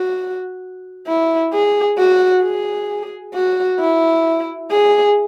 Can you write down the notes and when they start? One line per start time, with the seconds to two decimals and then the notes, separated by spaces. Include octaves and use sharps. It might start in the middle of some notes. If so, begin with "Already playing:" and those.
Already playing: F#4
1.07 E4
1.52 G#4
1.98 F#4
2.43 G#4
3.34 F#4
3.80 E4
4.71 G#4